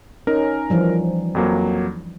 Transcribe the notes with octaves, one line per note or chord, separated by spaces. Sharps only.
C#4 D#4 A#4
E3 F3 G3
F2 F#3 A#3